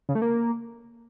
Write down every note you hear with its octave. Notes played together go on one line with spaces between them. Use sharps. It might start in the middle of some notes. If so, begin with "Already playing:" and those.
C#3
A3
A#3